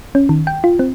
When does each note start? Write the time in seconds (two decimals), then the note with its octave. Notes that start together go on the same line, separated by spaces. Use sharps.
0.15 C#4
0.29 D#3
0.47 G5
0.64 F4
0.79 C4